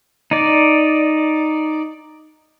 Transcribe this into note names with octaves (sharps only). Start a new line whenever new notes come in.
D#4 D5